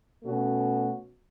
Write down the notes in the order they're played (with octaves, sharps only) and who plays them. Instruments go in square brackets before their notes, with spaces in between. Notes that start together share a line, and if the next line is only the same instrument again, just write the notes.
[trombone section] B2 A3 C#4 F#4